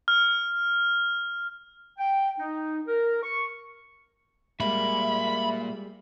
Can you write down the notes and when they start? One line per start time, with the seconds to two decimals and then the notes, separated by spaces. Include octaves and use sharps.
0.08 F6
1.98 G5
2.40 D#4
2.87 A#4
3.23 C#6
4.60 A#2 G3 G#3 A#3 E5 B5